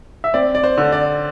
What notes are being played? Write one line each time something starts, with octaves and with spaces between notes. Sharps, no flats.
E5
C4 D5
D5
C5
D3
D5